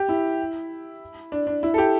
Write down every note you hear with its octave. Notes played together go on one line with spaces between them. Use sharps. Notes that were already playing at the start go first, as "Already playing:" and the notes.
Already playing: G4
E4
D4
D4
E4
A4
G4